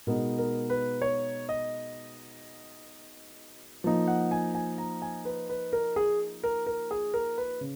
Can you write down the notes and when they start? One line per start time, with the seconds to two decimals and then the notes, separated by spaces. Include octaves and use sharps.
0.07 B2 G#3 B3 D#4 A#4
0.38 A#4
0.70 B4
1.02 C#5
1.49 D#5
3.84 F3 A#3 D#4
4.08 F#5
4.31 G#5
4.55 G#5
4.78 A#5
5.02 G#5
5.25 B4
5.49 B4
5.73 A#4
5.96 G#4
6.43 A#4
6.67 A#4
6.91 G#4
7.14 A#4
7.38 B4
7.61 C#3